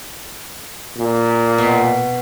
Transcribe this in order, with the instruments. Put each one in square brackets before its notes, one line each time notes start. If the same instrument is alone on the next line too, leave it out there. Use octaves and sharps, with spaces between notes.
[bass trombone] A#2
[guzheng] B2